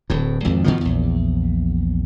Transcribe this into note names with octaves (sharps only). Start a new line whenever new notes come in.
D1 A2
G#1 F2
B2 D#3 F3
A#1 E2